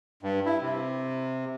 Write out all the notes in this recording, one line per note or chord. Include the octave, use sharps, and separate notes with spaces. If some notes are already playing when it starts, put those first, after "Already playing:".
G2
E4
C3